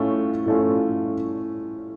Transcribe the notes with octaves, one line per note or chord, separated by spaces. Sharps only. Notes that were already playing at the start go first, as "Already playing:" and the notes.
Already playing: A2 A3 C#4 F4
A2 A3 C#4 F4